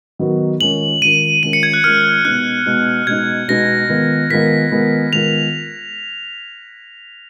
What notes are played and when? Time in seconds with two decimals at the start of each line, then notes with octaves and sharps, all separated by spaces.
0.19 D#3 F#3 B3 D#4 F#4
0.61 D#3 G#3 C#4 F4 A#4 F#7
1.01 D#3 G#3 C#4 F4 A#4 D#7
1.43 D#3 G#3 C#4 F4 A#4 D#7
1.53 C#7
1.63 G#6
1.74 F#6
1.84 D#3 G#3 C#4 F4 A#4 F6
2.25 B2 G#3 B3 D#4 F#6
2.66 B2 G#3 B3 D#4
3.07 B2 G#3 B3 D#4 G#6
3.48 B2 G#3 B3 D#4 A#6
3.89 D#3 G#3 B3 F4 A#4
4.30 D#3 G#3 B3 F4 A#4 B6
4.71 D#3 G#3 B3 F4 A#4
5.13 D#3 G#3 B3 F4 A#4 F7